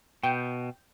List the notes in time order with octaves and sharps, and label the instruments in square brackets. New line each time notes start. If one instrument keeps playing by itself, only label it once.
[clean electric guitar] B2 [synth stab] G5